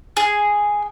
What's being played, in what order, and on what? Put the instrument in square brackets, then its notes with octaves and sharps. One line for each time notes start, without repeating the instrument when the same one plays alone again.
[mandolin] G#4